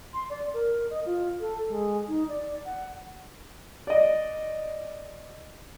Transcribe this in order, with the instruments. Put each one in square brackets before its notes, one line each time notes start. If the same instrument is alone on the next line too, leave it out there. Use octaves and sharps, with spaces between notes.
[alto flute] C6
D5
A#4
D#5
F4
A4
G#3
D#4
D5
F#5
[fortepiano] D5 D#5